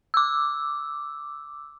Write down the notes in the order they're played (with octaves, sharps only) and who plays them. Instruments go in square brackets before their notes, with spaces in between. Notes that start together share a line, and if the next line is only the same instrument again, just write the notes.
[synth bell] D6 E6